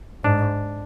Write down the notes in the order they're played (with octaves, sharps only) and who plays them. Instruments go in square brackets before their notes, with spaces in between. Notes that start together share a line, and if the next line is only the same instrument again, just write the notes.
[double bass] G#2 [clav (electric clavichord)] D4